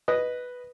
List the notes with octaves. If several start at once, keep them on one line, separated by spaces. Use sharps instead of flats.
B4 D#5